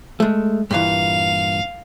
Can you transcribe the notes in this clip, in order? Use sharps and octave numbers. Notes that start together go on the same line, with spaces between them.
G#3 A3
G2 A#2 E3 F5